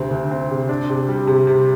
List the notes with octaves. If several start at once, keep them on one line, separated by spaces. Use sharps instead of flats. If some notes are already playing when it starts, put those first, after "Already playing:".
Already playing: D2 C3 C4
D2
C4
C3
D4
C3
G3
C3
C3